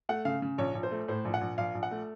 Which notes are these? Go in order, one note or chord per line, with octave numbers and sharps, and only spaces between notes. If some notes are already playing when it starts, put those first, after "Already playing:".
A3 F#5
C#3 F5
C#3
A#1 C#5
A#1
C5
A3
A2 C5
A#1
F#5
A#1
A#1 F5
A#1
F#5
A3